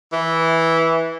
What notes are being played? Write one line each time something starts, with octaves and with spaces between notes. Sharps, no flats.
E3